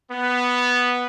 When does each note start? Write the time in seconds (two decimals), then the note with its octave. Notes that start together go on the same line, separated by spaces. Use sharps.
0.11 B3